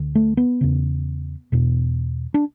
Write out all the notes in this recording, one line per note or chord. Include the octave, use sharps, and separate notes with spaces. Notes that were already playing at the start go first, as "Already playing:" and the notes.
Already playing: D2 D3
A3
B3
E2 C#3
E2 B2
D4